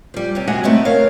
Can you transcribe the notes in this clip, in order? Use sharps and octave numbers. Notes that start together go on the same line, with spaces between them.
F3 G3
C3 C#4 G4
C3 G#3 F#4 F#5 G#5
A3 B3 C4 D#4 E4
C#3 A#4 C#5 F5